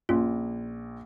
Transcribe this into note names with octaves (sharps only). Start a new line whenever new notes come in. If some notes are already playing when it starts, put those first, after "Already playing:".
A#1 C#4 F4